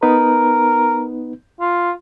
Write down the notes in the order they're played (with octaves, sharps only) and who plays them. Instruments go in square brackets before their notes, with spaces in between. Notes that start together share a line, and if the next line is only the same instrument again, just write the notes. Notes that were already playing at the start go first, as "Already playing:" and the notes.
[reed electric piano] B3 D#4 B4 [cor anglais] A#4
[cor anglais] F4